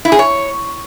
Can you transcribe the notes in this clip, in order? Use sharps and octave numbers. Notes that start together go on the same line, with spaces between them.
E4
G#4
C#5